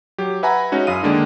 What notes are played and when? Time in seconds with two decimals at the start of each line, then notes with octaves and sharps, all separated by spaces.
0.18 F#3 G4
0.43 B4 E5 F#5 G#5 A#5 B5
0.72 G#3 C#4 D#4 F#4
0.87 F#2 E4 F5 D#6 D#7
1.03 D3 D#3 G#3 A#3 D4